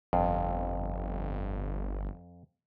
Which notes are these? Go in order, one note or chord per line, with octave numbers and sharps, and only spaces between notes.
G1 F2